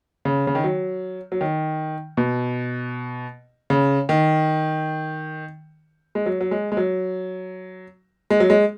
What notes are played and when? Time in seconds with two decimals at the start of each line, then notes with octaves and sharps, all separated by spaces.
0.25 C#3
0.47 C#3
0.55 D#3
0.64 F#3
1.32 F#3
1.41 D#3
2.17 B2
3.70 C#3
4.09 D#3
6.15 G#3
6.26 F#3
6.41 F#3
6.51 G#3
6.72 G#3
6.77 F#3
8.30 G#3
8.40 F#3
8.50 G#3